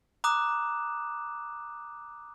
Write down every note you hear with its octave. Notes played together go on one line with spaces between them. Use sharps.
A#5 D6 D#6 F#6 E7